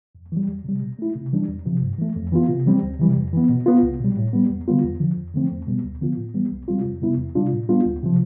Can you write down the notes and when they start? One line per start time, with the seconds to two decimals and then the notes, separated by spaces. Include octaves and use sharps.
0.15 F2
0.32 E3 G3
0.48 E2
0.64 C3 G3
0.81 B2
0.99 A3 E4
1.15 C3
1.33 E3 G3 D4
1.48 E2
1.66 C3 F3
1.82 G2
1.98 E3 A3
2.16 F2
2.32 E3 B3 F4
2.49 C3
2.66 E3 G3 C4
2.83 D2
2.99 C3 E3 G3
3.17 F2
3.33 E3 B3
3.49 B2
3.66 B3 F4
3.83 C2
4.00 B2 G3
4.17 A2
4.33 G3 B3
4.50 E2
4.68 D3 G3 B3 F4
4.84 E2
5.00 D3 F3
5.17 F2
5.34 D3 F3 A3 C4
5.51 E2
5.67 B2 G3 B3
5.84 D2
6.01 D3 F3 B3 F4
6.18 A2
6.34 E3 G3 B3
6.52 C2
6.68 C3 G3 C4 F4
6.85 F2
7.02 C3 G3 B3 E4
7.18 E2
7.35 C3 G3 D4 F4
7.52 A2
7.69 G3 B3 D4 F4
7.85 D2
8.03 C3 F3